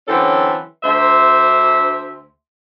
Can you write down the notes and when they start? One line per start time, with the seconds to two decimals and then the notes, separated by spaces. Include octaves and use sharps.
0.07 D3 E3 F#3 C4 C#4 A4
0.83 D2 C5 E5